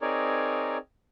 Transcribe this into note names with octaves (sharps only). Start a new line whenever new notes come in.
C4 D#4 G#4 A#4 C#5 D5